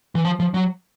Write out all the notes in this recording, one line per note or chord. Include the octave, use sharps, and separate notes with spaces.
E3
F3
F3
F#3